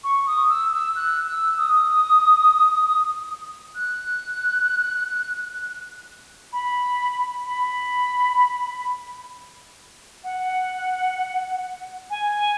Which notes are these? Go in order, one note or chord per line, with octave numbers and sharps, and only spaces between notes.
C#6
D#6
E6
E6
F#6
E6
D#6
F#6
B5
B5
F#5
G#5